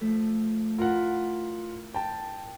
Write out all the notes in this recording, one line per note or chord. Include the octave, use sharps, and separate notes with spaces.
F3 A3 A4
E4 F4 A#4 F#5
G5 A5